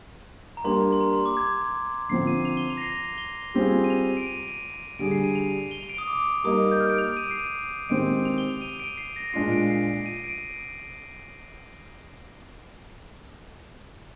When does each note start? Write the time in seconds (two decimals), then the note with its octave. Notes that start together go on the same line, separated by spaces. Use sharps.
0.57 A#5
0.64 G3 A#3 D4 G4 C6
0.93 C6
1.01 A#5
1.13 C6
1.26 D6
1.37 G#6
2.10 D3 F3 C4 C7
2.27 D#7
2.45 F7
2.57 G7
2.70 F7
2.77 A#6
2.82 C7
3.18 G7
3.54 G3 C4 F4 G#4
3.84 D#7
3.90 F7
4.17 D7
4.27 D#7
4.99 D3 G3 D4 G#4 D7
5.11 C7
5.24 D#7
5.35 F7
5.71 G7
5.81 F7
5.90 D7
5.98 D#6
6.08 D6
6.44 G3 A#3 D#4 D#6
6.71 G6
6.80 F6
6.90 D7
6.98 F7
7.08 D7
7.17 D#7
7.24 D7
7.31 C7
7.39 D7
7.89 D#3 G#3 C4 G4 D7
8.25 F7
8.38 G7
8.49 F7
8.62 D#7
8.80 D7
8.98 C7
9.16 A#6
9.34 A#2 G#3 D4 F4 C7
9.52 D7
9.70 C7
10.06 D#7
10.24 D7